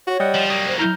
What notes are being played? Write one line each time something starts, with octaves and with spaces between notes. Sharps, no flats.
F#4 C#5
G3 D#5 F#5
F3
F#3 A#3 D#6
C5
E4 A#5 F6 G6